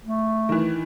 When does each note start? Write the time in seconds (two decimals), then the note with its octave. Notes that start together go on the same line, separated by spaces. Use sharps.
0.05 A3
0.49 D#3 E3